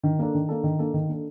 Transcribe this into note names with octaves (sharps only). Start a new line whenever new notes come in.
D#3
A#3 D4 A4
D#3
A#3 D4 A4
D#3
A#3 D4 A4
D#3
A#3 D4 A4